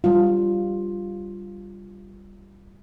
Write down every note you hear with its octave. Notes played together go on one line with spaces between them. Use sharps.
G3 F4